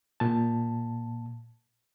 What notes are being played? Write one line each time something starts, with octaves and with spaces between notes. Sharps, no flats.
A#2 A5